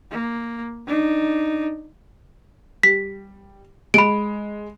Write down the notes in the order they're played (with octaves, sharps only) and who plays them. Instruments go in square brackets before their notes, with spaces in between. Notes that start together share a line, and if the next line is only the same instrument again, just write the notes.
[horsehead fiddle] A#3
D4 D#4
[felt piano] G3 [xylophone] B6
[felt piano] G#3 [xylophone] B5 D7